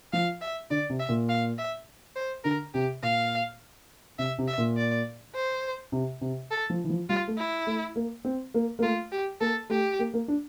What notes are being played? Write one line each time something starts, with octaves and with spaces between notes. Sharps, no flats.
F3 F5
E5
D3 D5
C3
E5
A#2
F5
E5
C5
D3 A#4
C3 G4
A#2 F5
C3 E5
C3
E5
A#2
D5
C5
C3
C3
A4
F3
E3
F3
G3 F4
A3
E4
A3
A#3
C4
A#3
A#3
A3 F4
G4
A#3 A4
A3 G4
A#3
A#3
D4